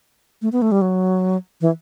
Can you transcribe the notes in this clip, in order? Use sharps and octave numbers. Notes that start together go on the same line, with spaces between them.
A3
B3
A3
G3
F#3
E3